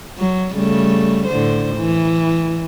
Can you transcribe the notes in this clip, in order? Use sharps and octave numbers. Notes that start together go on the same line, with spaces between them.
F#3
C#3 G3 A3
A2 D3 C5
E3